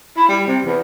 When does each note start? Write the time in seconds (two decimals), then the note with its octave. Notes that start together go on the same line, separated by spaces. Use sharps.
0.17 E4
0.28 G3
0.47 C3
0.64 E2